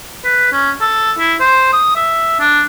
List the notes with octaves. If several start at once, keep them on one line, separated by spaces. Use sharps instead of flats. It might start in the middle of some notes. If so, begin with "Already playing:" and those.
B4
C#4
A4
E4
C5
D#6
E5
D4